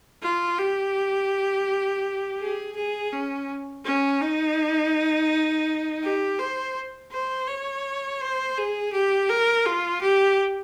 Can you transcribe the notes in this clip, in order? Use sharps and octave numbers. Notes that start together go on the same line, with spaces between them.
F4
G4
G#4
G#4
C#4
C#4
D#4
G4
C5
C5
C#5
C5
G#4
G4
A#4
F4
G4